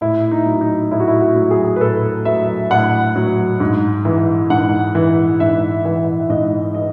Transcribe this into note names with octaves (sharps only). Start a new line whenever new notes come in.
A2 E4
D#4
F#3
D#4
A2 E4
F#4
E4
F#4
F#3
G#4
B4
A2 A4
F#3 E5
A2 F#5
F#3
G#2
E3
G#2 F#5
E3
G#2 E5
E3 E5
G#2 D#5
E3 D#5